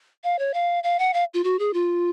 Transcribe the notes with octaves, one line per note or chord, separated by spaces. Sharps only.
F5
C#5
F5
F5
F#5
F5
F4
F#4
G#4
F4